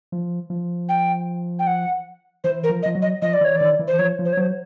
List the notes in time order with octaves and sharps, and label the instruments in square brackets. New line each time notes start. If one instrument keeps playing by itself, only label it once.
[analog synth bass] F3
F3
[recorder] G5
G5
F#5
[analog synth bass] E3 [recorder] C5
[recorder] A#4
[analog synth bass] F3
[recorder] D#5
[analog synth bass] F3
F#3
[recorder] D#5
[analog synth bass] F3 [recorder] D#5
[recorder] D5
[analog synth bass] E3 [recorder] C#5
[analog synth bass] D#3 [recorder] D5
[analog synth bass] E3
[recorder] C5
[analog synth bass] F3 [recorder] C#5
[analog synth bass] F3
[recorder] C5
C#5
[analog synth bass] F#3 [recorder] C5